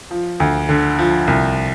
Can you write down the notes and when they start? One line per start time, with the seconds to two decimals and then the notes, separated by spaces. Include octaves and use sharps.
0.11 F3
0.40 D2
0.69 D3
0.99 F3
1.27 C2